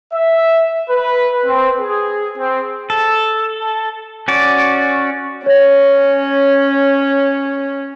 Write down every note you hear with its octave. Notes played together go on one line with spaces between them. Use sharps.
E5
B4
C4
G#4
C4
A4
C#4 F#4 D5
C#4 C#5 A#6